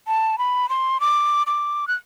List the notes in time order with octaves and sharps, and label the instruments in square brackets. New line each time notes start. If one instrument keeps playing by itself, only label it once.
[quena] A5
B5
C6
D6
D6
F#6